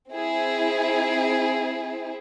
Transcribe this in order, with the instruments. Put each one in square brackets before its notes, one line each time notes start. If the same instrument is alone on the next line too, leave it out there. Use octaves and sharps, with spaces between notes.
[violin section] C4 E4 G#4